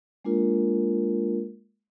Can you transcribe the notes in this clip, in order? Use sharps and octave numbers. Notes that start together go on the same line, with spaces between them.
G#3 A#3 D4 F4 A#4